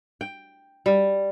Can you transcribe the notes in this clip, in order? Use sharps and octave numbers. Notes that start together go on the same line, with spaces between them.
G5
G3